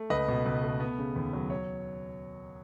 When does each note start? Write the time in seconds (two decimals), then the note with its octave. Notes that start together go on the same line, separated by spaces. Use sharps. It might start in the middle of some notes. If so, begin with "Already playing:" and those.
Already playing: A3
0.10 C#2 B4 D#5
0.28 B2
0.46 C#2
0.63 A3
0.80 B3
0.98 C#3
1.16 D#2
1.33 F#3
1.50 C#5